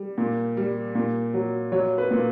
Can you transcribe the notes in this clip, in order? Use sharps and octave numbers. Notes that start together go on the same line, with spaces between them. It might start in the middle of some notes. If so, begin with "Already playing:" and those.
Already playing: G3
A#2
G3
A#2
F#3
F#3 C#5
B4
A#2